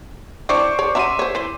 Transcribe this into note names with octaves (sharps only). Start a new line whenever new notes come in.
C4 D4 E4 C5 C#6 D6
C#5 D5
F#3 C#4 E5 A#5 C6 D#7
C5 C#5
E3 C5